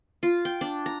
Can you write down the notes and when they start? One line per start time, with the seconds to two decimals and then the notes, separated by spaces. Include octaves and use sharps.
0.23 F4
0.45 G5
0.61 D4
0.86 A#5